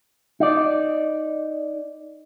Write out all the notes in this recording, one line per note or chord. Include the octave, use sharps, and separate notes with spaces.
D#4 D5